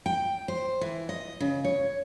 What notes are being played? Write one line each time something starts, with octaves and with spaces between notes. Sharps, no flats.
G5
C5
E3
D#5
C#3
C#5